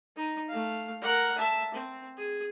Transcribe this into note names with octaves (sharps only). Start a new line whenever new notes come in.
D#4
A3 F5
A#4 F#5
E5 A5
C4
G#4